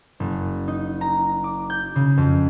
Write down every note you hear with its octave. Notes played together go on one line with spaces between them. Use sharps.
F#1
D#4
A#5
D6
G6
C#3
F2